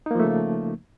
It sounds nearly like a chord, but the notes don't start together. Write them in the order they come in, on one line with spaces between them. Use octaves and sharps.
D#4 A#3 F3 A3 C#3